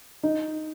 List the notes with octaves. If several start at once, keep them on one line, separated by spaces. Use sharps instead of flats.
D#4